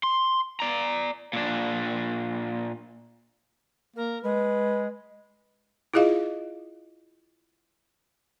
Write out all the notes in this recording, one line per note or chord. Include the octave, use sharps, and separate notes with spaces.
C6
D5 A#5
A#2 D4
A#3 A#4
G#3 B4
E4 F4 G#4 D#5 F5